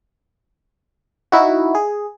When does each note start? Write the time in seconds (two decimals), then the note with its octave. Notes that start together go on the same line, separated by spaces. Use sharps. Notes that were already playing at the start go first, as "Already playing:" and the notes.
1.32 D#4 E4 F#4
1.75 G#4